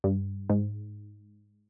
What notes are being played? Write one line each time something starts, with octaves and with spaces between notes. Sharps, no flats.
G2
G#2